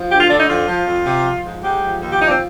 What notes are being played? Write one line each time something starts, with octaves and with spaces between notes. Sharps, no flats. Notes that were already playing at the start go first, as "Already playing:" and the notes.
Already playing: F3
D2 G4
F4
D3 D4
D#4
F2 F4
F3
F2
C3
F3
G#2
G#2 G4
F3
D#2
G4
F3 D#4
D4
C4